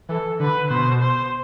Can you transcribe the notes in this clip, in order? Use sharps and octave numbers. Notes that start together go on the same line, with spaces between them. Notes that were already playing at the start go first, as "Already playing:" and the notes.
E3 A4
D3 B4
B2 C5
C5